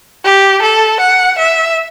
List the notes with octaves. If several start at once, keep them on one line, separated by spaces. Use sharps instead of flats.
G4
A4
F#5
E5